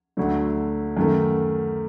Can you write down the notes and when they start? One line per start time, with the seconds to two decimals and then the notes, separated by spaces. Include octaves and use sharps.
0.17 D2 D3 F#3 A3
0.97 F#2 D#3 A3